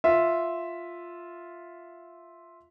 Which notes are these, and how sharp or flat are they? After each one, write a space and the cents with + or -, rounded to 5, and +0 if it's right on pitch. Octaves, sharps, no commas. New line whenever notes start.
F4 +0 E5 +0